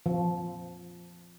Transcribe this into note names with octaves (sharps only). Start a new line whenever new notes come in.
F3